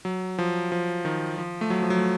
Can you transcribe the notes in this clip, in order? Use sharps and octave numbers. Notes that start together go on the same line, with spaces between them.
F#3
F3
F3
D#3
F3
A3
F#3
F3
F#3
A3